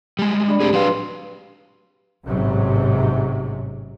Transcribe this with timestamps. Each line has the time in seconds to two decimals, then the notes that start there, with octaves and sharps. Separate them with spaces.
0.19 G3 G#3
0.47 D4 D5 B5
0.60 A3 C4 G4 G#4
0.73 F#3 D4 B4 F5 C6
2.26 A1 G#2 C3 F#3